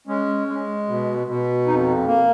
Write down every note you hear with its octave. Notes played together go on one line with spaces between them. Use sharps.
G#3 C#4
G#3
B2
B2
F2 D#4
A#3